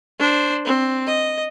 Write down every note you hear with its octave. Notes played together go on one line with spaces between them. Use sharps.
D4 C5
C4
D#5